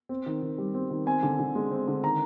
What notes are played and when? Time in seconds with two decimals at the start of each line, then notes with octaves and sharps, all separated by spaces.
0.09 C4
0.26 D#3
0.42 D#3
0.58 G3
0.74 C4
0.90 D#3
1.06 C4 G#5
1.23 D3
1.39 D3
1.55 G#3
1.71 C4
1.88 D3
2.03 D#3 A#5